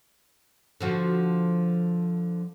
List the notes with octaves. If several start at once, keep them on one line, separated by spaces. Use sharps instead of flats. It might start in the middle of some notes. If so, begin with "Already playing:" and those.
D3 F3 F#4